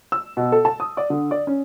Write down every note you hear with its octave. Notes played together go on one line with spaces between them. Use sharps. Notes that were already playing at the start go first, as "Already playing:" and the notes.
E6
B2
A4
A5
D#6
D5
D3
D5
C#4